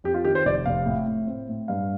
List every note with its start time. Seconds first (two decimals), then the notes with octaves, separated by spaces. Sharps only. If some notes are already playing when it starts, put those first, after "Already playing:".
0.04 F2 G4
0.14 F4
0.25 D#3 G4
0.35 C5
0.45 F1 D5
0.66 F1 F5
0.86 A2
1.07 A2
1.27 C4
1.49 A2
1.68 G2 F5